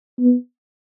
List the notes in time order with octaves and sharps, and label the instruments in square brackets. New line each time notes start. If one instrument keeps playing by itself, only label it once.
[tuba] B3